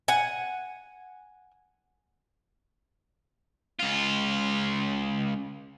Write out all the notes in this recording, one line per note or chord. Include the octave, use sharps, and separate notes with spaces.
F#5 G#5
C#2 F4